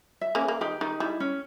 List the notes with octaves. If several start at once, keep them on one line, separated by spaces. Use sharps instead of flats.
E5
A#3 C#4
B4
A#3
D#3 G4
D#3 D#4
G3 E4
C#4